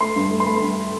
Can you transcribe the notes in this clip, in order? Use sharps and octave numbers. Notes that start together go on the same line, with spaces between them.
A3 C6
G2
A3
C6
A3 B5
G2